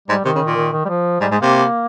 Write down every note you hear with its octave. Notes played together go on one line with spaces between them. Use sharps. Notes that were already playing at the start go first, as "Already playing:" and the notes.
G#2 G3
C3 D#3
C#3
A#2
D#3
D#3
G3
F3
G#2 G3
G#2 G#3
C3 A#3